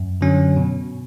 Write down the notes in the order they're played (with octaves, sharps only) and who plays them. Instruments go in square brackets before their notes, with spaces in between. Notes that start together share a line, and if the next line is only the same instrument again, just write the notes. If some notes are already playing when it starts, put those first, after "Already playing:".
Already playing: [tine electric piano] F#2
D3 F#3 C#4
B2